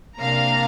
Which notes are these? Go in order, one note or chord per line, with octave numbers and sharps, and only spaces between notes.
C3 A#3 D4 F5 A#5